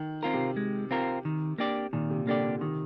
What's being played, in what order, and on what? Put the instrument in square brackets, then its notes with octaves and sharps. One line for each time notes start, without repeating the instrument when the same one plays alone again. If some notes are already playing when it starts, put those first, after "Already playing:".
Already playing: [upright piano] D#3
[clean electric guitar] C4 F4 A#4
[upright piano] C3
[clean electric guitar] G#3
C4 F4 A#4
D#3
A#3 D4 G4 D5
[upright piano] A#2 [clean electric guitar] D#3
[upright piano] C3
[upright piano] D3 [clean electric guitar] A#3 D4 G4 D5
[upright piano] C3
[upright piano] C3 [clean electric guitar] D#3